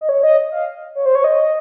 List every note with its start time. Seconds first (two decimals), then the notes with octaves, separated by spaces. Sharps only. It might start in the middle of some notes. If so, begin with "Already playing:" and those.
0.01 D#5
0.09 C#5
0.23 D#5
0.52 F5
0.95 C#5
1.06 C5
1.15 C#5
1.24 D#5